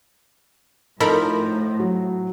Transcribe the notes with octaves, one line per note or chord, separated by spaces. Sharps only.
A2 F3 D#4 A4 A#4 B5
F#3